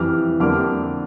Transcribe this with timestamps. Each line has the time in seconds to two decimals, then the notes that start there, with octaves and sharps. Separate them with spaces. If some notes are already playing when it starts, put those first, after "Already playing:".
Already playing: F2 E3 G3 D6 F6
0.40 F2 D3 G3 A#3 D6 F6